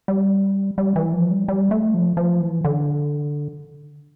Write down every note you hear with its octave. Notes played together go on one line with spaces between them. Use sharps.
G3
G3
E3
F3
G3
G3
A3
F3
F3
E3
D3